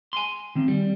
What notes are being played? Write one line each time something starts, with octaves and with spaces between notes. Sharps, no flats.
G#5 C6
D#3 C4
G3